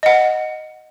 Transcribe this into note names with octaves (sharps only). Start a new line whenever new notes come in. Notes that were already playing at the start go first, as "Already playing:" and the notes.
D#5 F#5